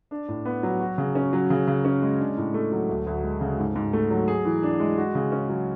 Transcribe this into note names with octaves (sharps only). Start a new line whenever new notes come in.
D4
A2
B3
F#3
F#4
C#3
C#4
F#3
C#3
C#3
C#4
G#3
D4
A2
A3
F#3
D2
D2
G#3
C#3
G#2
G#2
A3
F#3
G#4
E3
D4
G#3
F#4
C#3
C#4
F#3